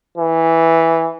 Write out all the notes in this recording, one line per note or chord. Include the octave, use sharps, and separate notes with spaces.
E3